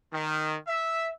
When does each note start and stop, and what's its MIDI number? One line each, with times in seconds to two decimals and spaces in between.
0.12 0.56 51
0.67 1.10 76